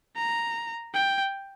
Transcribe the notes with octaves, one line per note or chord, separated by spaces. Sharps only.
A#5
G5